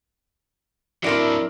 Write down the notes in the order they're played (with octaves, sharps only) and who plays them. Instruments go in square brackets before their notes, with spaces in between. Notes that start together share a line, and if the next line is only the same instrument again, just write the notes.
[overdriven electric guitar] F#3 D4 [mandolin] C4 A#4 D5 [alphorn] E4